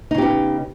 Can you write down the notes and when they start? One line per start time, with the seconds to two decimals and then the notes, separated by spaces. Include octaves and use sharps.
0.11 D#4
0.15 C#3
0.18 G4
0.22 B3